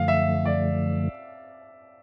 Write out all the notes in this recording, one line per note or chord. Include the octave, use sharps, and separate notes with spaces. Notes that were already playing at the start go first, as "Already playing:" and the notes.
Already playing: F#2 D3 F3 A3 F5
E5
D5